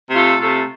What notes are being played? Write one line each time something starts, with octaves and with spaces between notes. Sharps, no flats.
C3 A3 F4 A4
C3 A3 F4 A4